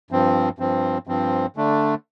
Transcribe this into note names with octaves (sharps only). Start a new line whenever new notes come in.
G2 F3 C4
G2 F3 C4
G2 F3 C4
D3 A3 D4